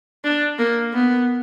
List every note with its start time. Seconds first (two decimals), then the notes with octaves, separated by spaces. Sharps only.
0.24 D4
0.59 A#3
0.94 B3